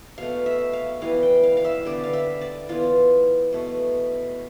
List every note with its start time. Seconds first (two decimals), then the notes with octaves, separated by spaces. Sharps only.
0.18 B2 A3 F5
0.46 E5
0.73 F5
1.02 E3 G3 B3 F5
1.23 G5
1.43 F5
1.57 F5
1.64 E5
1.85 D3 G3 B3 D5
2.04 F5
2.13 E5
2.41 D5
2.69 E3 B3 F4
3.53 B2 A3